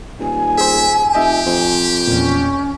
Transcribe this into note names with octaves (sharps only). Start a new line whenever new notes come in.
D#1 G#5
G#4 C5 E5
F1 G4 D#5 E5
F2 C5
E2 A#2 C#4